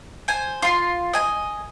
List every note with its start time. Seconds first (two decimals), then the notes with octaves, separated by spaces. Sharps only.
0.28 C5 G#5
0.62 F4 C6
1.13 D#5 G#5